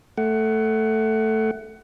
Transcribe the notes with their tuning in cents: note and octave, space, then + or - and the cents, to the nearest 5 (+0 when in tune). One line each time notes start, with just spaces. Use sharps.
A3 +0 F#5 +20